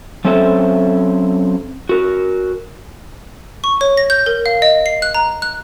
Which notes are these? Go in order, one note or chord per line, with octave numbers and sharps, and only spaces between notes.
F#3 C4 C#4 A4 C5 E5
F#4 A#4
C#6
C#5
A#6
G6
A#4
F5
D#5
C7
F#6
A#5
F#6